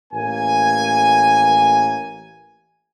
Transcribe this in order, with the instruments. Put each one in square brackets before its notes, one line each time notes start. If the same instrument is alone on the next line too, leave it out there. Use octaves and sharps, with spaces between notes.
[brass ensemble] A1 A#3 G#5